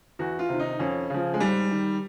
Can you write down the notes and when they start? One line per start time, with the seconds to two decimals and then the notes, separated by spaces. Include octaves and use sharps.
0.19 E2 F#4
0.39 F4
0.49 C3 D#3
0.59 D#4
0.79 F2 C#4
1.10 C#3 F3
1.34 G#3
1.40 G#2 G3
1.71 D#3